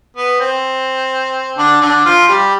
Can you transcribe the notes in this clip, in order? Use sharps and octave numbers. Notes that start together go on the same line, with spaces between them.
B3
C4
D3 D4
D3 D4
F3 F4
G3 G4